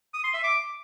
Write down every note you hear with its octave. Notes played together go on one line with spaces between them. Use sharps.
D#6
C6
E5
D6